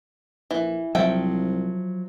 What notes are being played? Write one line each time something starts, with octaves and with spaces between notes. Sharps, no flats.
A#1 E3
C2 F3 F#3 E5 G5